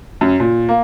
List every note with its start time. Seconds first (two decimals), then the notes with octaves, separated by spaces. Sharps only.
0.21 F#2
0.40 A#2
0.69 A#3